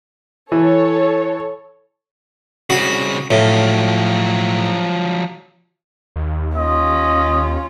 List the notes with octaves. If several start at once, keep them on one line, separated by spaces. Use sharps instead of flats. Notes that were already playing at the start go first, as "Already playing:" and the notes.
E3 A4 C#5
C2 C#3 F#4
A2 F3 F#3
D#2
C#4 F4 D#5